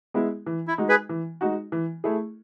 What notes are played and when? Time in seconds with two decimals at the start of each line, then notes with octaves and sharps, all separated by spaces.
0.14 G#3 B3 E4 G#4
0.46 E3
0.67 E4
0.78 G#3 D#4 F#4
0.89 G#4 B4
1.09 E3
1.41 G#3 D#4 F#4
1.72 E3
2.04 A3 E4 G#4